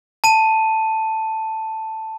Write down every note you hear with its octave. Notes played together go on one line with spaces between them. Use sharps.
A5 D#7